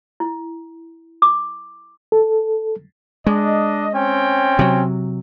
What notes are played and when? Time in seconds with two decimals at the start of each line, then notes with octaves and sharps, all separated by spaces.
0.20 E4
1.22 D6
2.12 A4
3.27 G#3 D4 D#5
3.94 C4 C#4 G5
4.59 C3 F#3